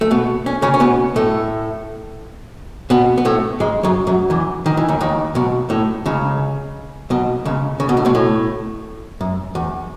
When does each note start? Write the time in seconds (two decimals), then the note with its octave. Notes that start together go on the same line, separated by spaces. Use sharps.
0.01 A3
0.11 B2 B3
0.46 C#4
0.62 C#3 C#4
0.74 C#4
0.80 B2 B3
1.16 A2 A3
2.90 B2 B3
3.18 B3
3.25 A2 A3
3.60 G#2 G#3
3.83 F#2 F#3
4.07 F#2 F#3
4.30 E2 E3
4.66 D#3
4.77 E3
4.88 D#2 D#3
5.01 D#2 D#3
5.35 B1 B2
5.70 A2
6.06 C#2 C#3
7.10 B1 B2
7.45 C#2 C#3
7.80 C#3
7.89 B2
7.97 A2
8.05 B1 B2
8.15 A2
9.21 F#2
9.55 E2